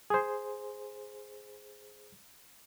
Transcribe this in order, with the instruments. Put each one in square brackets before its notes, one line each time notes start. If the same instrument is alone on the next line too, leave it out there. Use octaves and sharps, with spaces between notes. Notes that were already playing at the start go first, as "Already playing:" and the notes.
[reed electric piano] G#4 C5